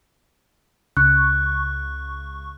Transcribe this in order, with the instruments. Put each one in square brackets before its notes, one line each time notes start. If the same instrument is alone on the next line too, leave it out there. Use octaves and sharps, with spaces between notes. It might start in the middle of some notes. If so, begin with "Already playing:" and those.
[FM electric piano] C#2 C#3 C#6 [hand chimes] F#6